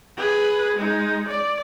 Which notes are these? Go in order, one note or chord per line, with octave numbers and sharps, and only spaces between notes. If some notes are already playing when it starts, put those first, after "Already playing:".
G#4 B4
G#3 D#4
D5